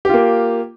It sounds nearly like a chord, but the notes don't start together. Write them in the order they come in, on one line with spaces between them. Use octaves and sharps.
G4 F4 A#3